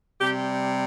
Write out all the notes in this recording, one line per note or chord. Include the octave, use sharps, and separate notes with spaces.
C3 G3 G4